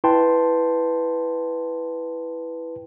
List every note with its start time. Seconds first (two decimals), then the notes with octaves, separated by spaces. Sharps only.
0.04 E4 B4 G5 A5 C6